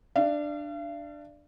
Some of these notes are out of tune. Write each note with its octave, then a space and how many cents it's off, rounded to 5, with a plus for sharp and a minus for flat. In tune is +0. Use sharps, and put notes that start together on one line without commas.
D4 +10 F5 -45